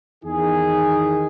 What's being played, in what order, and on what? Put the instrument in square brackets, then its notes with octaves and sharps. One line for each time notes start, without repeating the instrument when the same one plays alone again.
[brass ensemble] E2 D#3 D#4 G#4